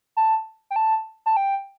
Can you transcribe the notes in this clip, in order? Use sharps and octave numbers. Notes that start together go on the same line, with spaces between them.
A5
G5
A5
A5
G5